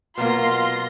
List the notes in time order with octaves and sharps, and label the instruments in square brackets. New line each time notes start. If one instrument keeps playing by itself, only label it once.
[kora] B2 F#3 A#3 [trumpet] F4 [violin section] C6 A#6